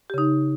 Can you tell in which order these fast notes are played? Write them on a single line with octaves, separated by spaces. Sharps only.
G4 C#3 D#4